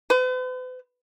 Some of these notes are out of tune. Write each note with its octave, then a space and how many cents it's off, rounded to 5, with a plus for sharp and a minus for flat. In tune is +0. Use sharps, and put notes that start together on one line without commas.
B4 +45